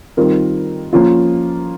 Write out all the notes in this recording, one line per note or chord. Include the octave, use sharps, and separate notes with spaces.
D#3 G3 C4 F4 A#4
F3 A#3 C#4 F4